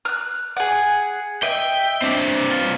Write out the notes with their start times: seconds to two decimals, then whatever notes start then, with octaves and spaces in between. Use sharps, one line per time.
0.05 F6 F#6
0.57 G#4 F#5
1.43 D#5 E5 G5
2.02 C4 D4
2.51 F4